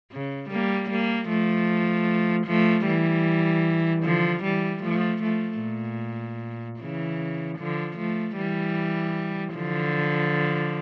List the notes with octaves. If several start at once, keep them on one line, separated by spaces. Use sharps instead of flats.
C#3
G3 A#3
G3 A#3
F3 A3
F3 A3
E3 G3
D3 F3
E3 G3
F3 A3
F3 A3
A#2
C#3 E3
D3 F3
F3 A3
E3 G3
D3 F3